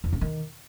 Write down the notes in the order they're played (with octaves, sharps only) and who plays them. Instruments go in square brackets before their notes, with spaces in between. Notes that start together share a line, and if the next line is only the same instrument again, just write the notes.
[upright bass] E2
C#3
D#3